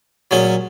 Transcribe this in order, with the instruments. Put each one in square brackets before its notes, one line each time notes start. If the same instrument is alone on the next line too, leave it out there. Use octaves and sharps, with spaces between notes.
[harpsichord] A#2 F#3 C#4 G#4